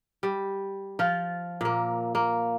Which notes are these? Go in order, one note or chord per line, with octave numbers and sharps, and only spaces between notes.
G3
F3 F4
A#2 A#3
A#3